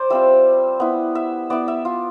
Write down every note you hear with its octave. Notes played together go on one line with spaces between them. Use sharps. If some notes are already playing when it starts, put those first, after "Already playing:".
Already playing: C5 D5
G3 C4 F4 E5
B3 E4
E5
B3 E4 D5
E5
F4